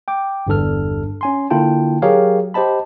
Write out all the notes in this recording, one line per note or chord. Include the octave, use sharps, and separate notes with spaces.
G5 D6
G1 E2 G2 A4 F6
C#4 G#5 C6
D3 A#3 E4 F4 G5 A5
F#3 G4 G#4 A#4 C#5 F5
G4 C5 D#5 A5 B5